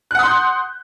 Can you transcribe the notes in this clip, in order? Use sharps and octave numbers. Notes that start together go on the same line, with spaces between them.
F#5 C6 D#6 F#6 G6